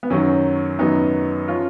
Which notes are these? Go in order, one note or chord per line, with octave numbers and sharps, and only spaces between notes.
B3
F#2 D#3 F#3 C#4
F#2 D#3 F#3 B3 D#4
F3 C#4 F4